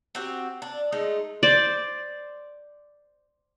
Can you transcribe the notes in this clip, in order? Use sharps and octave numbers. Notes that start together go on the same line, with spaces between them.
C4 F#4 G4
D4
G#3 A3 D#4
C5 D5